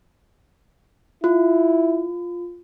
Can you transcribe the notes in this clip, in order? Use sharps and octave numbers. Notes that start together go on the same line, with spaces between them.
E4 F4